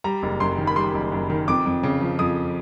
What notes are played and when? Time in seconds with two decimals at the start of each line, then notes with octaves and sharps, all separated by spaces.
0.04 G3 A#5
0.23 F#1
0.40 F#2 C6
0.58 D#3
0.67 B5
0.76 G3 C6
0.94 F#1
1.12 F#2
1.30 D#3
1.48 F2 D6
1.66 F2
1.83 C#3
2.01 F3
2.19 F2 D#6